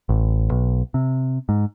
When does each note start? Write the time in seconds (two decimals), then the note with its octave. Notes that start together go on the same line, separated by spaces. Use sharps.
0.09 A1
0.51 B1
0.94 C3
1.49 G#2